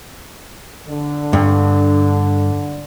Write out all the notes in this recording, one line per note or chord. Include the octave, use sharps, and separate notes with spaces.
D3
G2